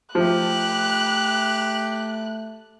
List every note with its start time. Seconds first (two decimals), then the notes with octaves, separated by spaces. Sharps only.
0.15 F3 A3 G4 F#6